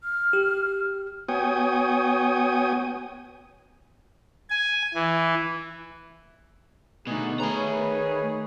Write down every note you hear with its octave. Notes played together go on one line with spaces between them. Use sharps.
F6
G4
B3 F#4 C#5 G5 G#5 D#6
G#5
E3
B2 D3 A3 D#4 F#4 G#4
D#3 A3 D#4 G#4 B4 C#5 A#5